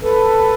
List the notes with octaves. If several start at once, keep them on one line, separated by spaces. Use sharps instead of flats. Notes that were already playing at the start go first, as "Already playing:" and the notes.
A4 B4